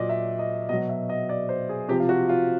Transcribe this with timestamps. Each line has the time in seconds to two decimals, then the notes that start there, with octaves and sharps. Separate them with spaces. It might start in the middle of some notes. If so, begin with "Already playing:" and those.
Already playing: A#2 F#3 D5 D#5
0.09 E5
0.39 D#5
0.69 B2 F#3 D#5
0.89 E5
1.09 D#5
1.29 D5
1.49 C5
1.69 G#4
1.89 C3 F3 G4
2.00 F4
2.09 F#4
2.29 F4